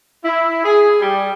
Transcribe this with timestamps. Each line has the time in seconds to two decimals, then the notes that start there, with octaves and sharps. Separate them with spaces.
0.24 E4
0.64 G#4
1.01 G3